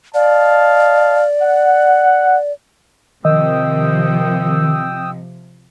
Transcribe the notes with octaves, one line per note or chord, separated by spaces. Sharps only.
D5 D#5 F5 A5
F#5
C3 D#3 F3 D#5 G5 D#6 E6